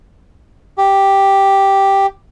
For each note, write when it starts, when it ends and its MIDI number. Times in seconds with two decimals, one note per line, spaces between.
0.78 2.06 67